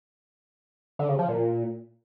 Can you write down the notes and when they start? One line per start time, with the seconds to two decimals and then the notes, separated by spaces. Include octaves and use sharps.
0.99 D3
1.09 C#3
1.19 F3
1.29 A#2